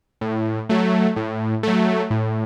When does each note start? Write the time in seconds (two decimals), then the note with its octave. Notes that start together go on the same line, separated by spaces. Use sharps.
0.21 A2
0.69 F#3 A3
1.16 A2
1.63 F#3 A3
2.11 A2